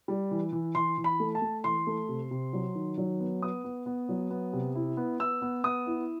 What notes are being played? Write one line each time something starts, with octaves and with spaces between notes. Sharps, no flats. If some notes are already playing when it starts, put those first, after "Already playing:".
G3
E3
E3
E3 C6
E3
B5
A3
A5
A3
E3 C6
A3
C3
C3
F#3
D#3
F#3
B3
B3 D#6
B3
B3
F#3
B3
C3
E4
B3
B3 E6
B3
B3 D#6
E4